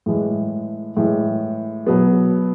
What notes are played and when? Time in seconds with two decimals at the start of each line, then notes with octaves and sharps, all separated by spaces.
0.06 A2 E3 G#3
0.97 A2 E3 G#3
1.87 B2 F#3 B3